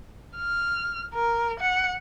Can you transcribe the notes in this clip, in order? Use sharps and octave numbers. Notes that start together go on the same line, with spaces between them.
F6
A#4
F#5